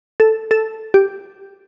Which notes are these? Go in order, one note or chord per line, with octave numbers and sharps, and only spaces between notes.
A4
A4
G4